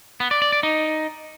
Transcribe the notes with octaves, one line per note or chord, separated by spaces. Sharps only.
B3
D5
D5
D5
D#4